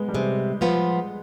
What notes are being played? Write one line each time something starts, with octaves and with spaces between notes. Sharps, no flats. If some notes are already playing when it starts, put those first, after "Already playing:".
Already playing: G#3 B3
G3
C3 G#3
F3 B3 F4